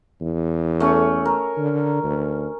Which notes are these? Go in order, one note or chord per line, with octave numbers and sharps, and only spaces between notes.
E2
A3 C#4
A#4
D3
D2